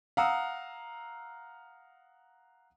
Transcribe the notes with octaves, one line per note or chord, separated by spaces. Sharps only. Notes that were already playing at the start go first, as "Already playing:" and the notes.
F5 F#5 A#5 D#6 E6